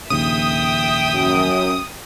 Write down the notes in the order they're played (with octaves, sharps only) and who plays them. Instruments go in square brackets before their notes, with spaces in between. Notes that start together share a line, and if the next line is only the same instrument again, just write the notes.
[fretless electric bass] A#1 D#2 C#3 [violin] E5 G5 [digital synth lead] D#6
[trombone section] F#2